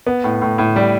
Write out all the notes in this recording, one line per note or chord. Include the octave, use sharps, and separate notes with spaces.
B3
A2
A2
A2
G3